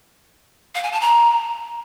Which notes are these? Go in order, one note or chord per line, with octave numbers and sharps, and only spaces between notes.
F5
G#5
A5
A#5